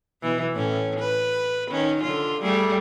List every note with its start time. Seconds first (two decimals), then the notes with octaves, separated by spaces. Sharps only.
0.22 B2 E3
0.54 A2 C#4
1.00 B4
1.71 D#3 C#4
2.03 D3 F4
2.42 G3 A3 G#4